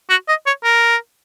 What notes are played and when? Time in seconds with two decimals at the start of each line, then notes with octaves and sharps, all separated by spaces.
0.10 F#4
0.28 D#5
0.46 C#5
0.64 A#4